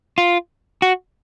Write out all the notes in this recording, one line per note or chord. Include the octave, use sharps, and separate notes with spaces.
F4
F#4